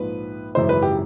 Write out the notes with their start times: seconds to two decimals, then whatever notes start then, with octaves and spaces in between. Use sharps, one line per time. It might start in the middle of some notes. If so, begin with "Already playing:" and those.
Already playing: A#1 G#2 F3 B4
0.55 G#1 F#2 C#3 E3 C5
0.69 B4
0.82 G4